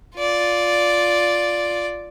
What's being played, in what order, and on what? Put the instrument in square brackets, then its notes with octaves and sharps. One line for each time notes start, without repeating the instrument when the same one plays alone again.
[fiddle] F4 D5